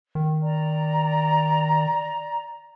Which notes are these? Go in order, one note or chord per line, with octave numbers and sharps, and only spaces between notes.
D#3
D5 A#5